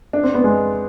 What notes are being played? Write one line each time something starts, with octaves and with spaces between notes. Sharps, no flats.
D4
C4
B3
G#3